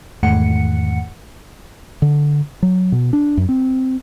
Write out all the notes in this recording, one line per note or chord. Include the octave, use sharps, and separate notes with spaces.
E2 G#2 D#3 A3 F#5 C#7
D3
F#3
B2
D4
F#2
C4